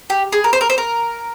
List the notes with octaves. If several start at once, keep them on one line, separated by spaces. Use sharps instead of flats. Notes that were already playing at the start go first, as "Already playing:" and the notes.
G4
G#4
A#4
C5
A#4
C5
A#4